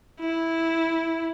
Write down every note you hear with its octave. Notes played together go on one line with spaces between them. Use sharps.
E4